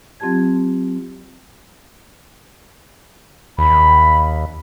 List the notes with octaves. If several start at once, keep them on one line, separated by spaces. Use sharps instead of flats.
F#3 C4 F4 G4 A5 G#6
D#2 B5